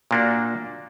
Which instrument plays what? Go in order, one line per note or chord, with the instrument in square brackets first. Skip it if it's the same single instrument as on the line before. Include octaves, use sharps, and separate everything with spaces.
[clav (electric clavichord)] A#2 A#3 D4 F#4